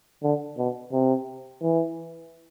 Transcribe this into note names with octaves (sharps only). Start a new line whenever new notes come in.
D3
B2
C3
E3